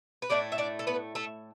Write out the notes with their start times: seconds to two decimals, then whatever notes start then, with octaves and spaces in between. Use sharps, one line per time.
0.22 B4
0.30 A2 A3 D4 D5
0.52 E5
0.58 D4 D5
0.79 A4
0.87 B3 B4
1.15 A3 A4